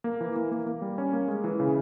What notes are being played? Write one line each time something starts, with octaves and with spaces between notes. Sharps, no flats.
A#3
E3
A#3
A#3
A#3
G3
C#4
A#3
G#3
E3
C#3